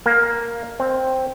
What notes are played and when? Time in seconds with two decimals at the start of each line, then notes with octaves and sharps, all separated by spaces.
0.06 A#3
0.80 C4